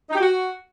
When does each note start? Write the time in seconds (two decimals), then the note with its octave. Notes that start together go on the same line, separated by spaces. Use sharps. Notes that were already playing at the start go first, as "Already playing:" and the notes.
0.10 D#4
0.15 G4
0.20 F#4